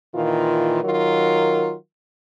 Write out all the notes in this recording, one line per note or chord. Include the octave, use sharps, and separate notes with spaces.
A#2 D#3 E3 F4
D#3 F#3 F4 A#4